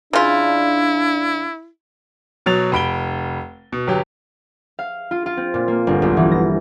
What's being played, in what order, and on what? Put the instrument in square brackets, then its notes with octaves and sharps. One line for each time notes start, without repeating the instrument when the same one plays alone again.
[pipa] C#3 F4 [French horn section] D4 [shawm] E4
[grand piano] B2 F#3 A6 F7
F1 B5 D7 G7
B2
G1 F#3 G4
[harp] F5
F4
F4
C4
A#2
A#3
G1
B1
E3
A#6